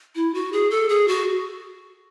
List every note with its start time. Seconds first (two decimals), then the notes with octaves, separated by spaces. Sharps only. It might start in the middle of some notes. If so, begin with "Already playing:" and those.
0.15 E4
0.34 F#4
0.53 G#4
0.70 A4
0.89 G#4
1.08 F#4